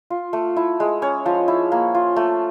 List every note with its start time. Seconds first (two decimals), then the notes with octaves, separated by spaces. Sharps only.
0.10 F4
0.33 A3
0.56 E4
0.80 G#3
1.02 C#4 C#5
1.26 F3
1.48 E4
1.72 A#3
1.95 F4
2.16 A3